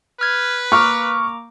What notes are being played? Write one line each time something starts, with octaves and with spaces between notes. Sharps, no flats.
B4 F6 G#6
A#3 A#5 C#6 D6 F6